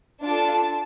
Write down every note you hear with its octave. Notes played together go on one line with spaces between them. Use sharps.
D4 F4 A4 A5